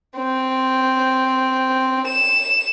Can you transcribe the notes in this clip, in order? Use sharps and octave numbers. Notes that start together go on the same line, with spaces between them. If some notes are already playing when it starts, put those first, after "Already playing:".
C4
E7